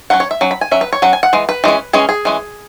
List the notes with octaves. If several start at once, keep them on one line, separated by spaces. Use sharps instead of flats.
F#3 C#4 F#5
C#5
E5
F#3 C#4
B5
G#5
F#3 C#4 E5
B4
C#5
F#3 C#4 F#5
G#5
F#5
E3 G#3
B4
E3 G#3 C#4
E3 G#3 C#4 G#4
G#4
E3 G#3 C#4